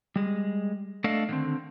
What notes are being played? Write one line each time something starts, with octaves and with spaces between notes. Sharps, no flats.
G3 G#3
A3 D4 A4 D#5 F5
D3 D#3 C4